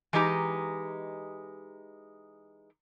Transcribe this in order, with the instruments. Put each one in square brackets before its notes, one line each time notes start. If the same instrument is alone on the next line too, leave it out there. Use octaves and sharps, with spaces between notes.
[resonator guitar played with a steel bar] E3 G#3 D#4 G4 A#5